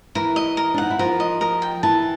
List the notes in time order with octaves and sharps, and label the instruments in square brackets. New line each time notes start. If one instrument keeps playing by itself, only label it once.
[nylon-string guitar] E3 E4 [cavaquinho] A#4
[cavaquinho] D#5
A#4
[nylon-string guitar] D4
[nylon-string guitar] D#4 [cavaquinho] F#5
[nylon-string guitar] E4
[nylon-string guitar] F3 F4 [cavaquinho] A#4
[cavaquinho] D#5
A#4
G5
[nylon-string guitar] E3 E4 [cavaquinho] A5